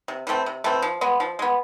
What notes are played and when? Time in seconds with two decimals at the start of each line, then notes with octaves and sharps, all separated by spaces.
0.08 C3
0.27 E3 A3 C4
0.46 C3
0.64 E3 A3 C4
0.82 F3
1.01 G#3 B3
1.20 F3
1.39 G#3 B3